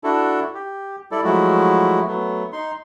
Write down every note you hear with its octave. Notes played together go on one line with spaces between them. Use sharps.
D4 E4 F#4 A4
G4
G3 E4 A4 D5
F3 F#3 G#3 A3 E4 F#4
F#3 A3 B3
D#4 C6